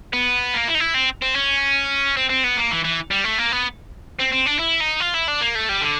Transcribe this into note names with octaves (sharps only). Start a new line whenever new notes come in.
B3
A#3
E4
D#4
E4
C4
C4
C#4
C4
C4
B3
A#3
E3
E3
G3
A3
A#3
B3
C4
C4
D4
E4
D#4
F4
E4
D4
A#3
A3
G3
D3